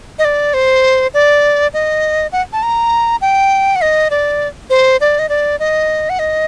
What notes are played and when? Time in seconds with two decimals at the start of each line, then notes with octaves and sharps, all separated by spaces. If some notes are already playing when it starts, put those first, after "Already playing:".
0.19 D#5
0.25 D5
0.54 C5
1.14 D5
1.73 D#5
2.32 F#5
2.53 A5
2.63 A#5
3.21 G5
3.76 F#5
3.82 D#5
4.11 D5
4.70 C5
5.01 D5
5.19 D#5
5.29 D5
5.60 D#5
6.10 F#5
6.19 D#5